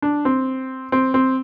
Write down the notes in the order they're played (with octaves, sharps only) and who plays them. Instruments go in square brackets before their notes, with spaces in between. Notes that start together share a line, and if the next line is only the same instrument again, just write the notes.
[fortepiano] D4
C4
C4
C4